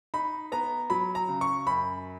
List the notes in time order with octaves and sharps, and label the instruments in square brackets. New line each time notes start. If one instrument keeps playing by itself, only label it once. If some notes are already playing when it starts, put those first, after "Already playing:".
[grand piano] D#4 B5
B3 A#5
F#3 B5
A#5
C#3
C#6
F#2 B5